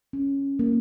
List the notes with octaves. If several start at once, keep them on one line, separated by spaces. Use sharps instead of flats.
C#4
A#3